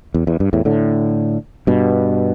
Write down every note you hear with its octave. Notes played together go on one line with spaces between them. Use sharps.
E2
E2
G2
E2 A2
A2 D3
G2 B2